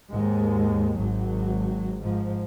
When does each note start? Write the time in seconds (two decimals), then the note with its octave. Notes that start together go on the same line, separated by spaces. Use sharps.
0.10 D#2 G#2 G#3
0.99 G#1 F#3
2.01 G#2 F3